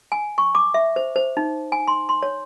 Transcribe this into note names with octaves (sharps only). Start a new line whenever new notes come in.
G#5
C#6
D6
E5
C5
C5
D#4
G#5
C6
C6
C#5